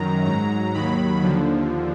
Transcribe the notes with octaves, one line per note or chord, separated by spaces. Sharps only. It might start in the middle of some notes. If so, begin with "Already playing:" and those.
Already playing: F#2 D#3 F#3 A#5
G#2 F#3 A#5
D#2 D#3 F#3 B5
D#2 D3 F3